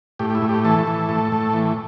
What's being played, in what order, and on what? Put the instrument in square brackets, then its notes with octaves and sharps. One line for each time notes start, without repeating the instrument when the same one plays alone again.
[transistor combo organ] A2 G4
G4
E4
A2
G4
E3 A4
E3
A2
A2
E3